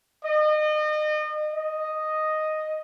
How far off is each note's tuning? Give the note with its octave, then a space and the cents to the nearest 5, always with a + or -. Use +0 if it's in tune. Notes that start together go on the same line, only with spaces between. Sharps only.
D#5 -35
D#5 +0